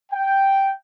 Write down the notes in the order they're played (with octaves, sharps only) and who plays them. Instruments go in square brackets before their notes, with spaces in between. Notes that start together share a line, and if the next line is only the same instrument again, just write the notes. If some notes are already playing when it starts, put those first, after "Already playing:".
[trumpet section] G5